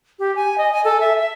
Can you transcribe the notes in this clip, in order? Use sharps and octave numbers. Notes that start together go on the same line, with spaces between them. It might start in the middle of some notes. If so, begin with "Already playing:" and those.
G4
G#5
D#5
G#5
A4
E5
E5